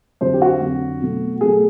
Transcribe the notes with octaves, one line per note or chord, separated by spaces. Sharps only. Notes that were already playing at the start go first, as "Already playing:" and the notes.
F2 D3 F#3 C5
G4
F#4
F2 D3 F#3
B2 F#3 A3
B2 F#3 A3 G#4